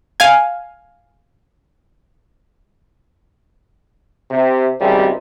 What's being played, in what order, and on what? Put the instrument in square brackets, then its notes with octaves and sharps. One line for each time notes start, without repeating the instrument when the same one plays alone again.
[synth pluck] F5 G#5
[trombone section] C3
G#1 C#2 C3 G3